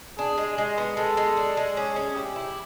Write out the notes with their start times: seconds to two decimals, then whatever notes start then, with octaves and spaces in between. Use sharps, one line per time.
0.18 D4 G#4
0.38 G#3
0.57 G#3 G#4
0.78 B3
0.97 G#3 A4
1.17 G#3
1.37 D4
1.57 G#3
1.77 C#4 G#4
1.96 C#4
2.15 E4 G4
2.36 E4